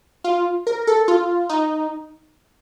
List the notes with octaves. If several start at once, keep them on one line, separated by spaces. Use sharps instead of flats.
F4
A#4
A4
F4
D#4